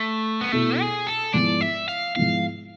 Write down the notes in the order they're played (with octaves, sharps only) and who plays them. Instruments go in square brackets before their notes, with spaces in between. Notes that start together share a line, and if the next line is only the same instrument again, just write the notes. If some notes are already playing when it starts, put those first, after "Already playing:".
Already playing: [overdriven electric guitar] A3
B3
[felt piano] B2 B3 E4 A4 [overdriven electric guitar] A3
[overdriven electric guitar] G#4
A4
[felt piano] G#2 F3 B3 E4 [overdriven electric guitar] D5
[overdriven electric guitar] E5
F5
[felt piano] G#2 F3 B3 E4 [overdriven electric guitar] F5